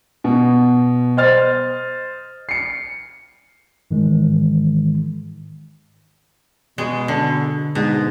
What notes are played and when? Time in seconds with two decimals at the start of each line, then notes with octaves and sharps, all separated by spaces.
0.24 B2
1.17 C5 D#5 F6 A6
2.49 C7 C#7
3.91 G#2 D#3 E3 G#3
6.78 B2 G#3
7.08 D3
7.75 G#2 B2